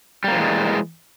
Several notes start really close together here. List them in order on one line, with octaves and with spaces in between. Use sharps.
G3 A#3 F3 E3 G#3